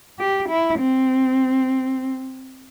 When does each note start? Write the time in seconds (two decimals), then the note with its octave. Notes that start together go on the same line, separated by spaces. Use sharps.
0.19 G4
0.49 E4
0.79 C4